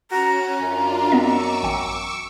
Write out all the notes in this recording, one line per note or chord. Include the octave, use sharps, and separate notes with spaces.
C#4 F#4 A#5
F#2 D4 F4
B3 C4 D#5 C#6 D6 E6
A1 G5